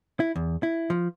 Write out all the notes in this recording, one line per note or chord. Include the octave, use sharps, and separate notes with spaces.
E4
E2
E4
F3